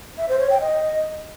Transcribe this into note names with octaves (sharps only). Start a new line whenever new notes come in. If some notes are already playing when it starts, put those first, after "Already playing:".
E5
C5
C#5
G5
D#5